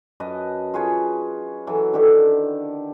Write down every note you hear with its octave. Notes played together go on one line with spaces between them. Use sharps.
F#2 B4 D#5 A5
F4 G#4 B4 C#5
E3 F#3 A4
D3 D#3 G4 A4